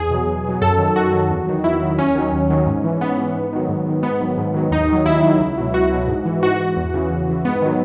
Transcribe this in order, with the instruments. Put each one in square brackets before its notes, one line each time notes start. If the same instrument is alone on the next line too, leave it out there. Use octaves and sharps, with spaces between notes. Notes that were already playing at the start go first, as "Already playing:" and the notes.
Already playing: [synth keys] E2 G#4
B2 F#3
E2
B2 F#3
F#2 A4
D#3 F#3
F#2 F#4
D#3 F#3
E2
D#3 F#3
E2 E4
D#3 F#3
D#2 C#4
D#3 F#3
D#2
D#3 F#3
G#2
E3
G#2 B3
E3
G#2
D#3 F#3
G#2
D#3 F#3
G#2 B3
D#3 F#3
G#2
D#3 F#3
D#2 D#4
D#3 F#3
D#2 E4
D#3 F#3
C#2
B2 F#3
C#2 F#4
B2 F#3
G#2
E3
G#2 F#4
E3
E2
C#3 E3
E2
C#3 E3
G#2 B3
D#3 F#3